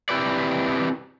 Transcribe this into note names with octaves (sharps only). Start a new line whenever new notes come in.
C4 E4 G4 B4 D5